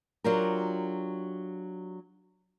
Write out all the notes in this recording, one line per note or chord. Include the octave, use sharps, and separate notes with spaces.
F#3 D4 F4 G4 A#4